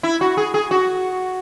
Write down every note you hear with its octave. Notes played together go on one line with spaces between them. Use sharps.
E4
F#4
G#4
G#4
F#4